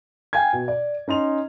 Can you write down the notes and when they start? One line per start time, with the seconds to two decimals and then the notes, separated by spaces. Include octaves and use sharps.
0.33 F5 G5 G#5 G#6
0.53 B2
0.68 D5
1.08 C#4 D#4 C6 F7